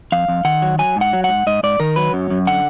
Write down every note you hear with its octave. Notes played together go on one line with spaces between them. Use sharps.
F2 F5
F2
D#3 F#5
F#3
F#3 G#5
G#2
F#5
F#3
G#2 F#5
G#2 D#5
G#2 D5
D#3 A#4
F#3 B4
F#2
F#2
D3 F#5